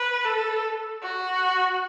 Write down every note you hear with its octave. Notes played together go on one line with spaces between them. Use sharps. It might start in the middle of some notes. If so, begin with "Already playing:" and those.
Already playing: B4
A4
F#4